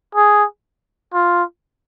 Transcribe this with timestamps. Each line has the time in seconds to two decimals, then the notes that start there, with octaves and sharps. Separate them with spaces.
0.15 G#4
1.14 F4